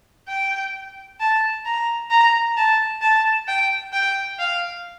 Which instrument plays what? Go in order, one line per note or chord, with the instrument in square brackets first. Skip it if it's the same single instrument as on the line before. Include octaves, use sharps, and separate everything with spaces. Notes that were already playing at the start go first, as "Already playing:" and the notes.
[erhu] G5
A5
A#5
A#5
A5
A5
G5
G5
F5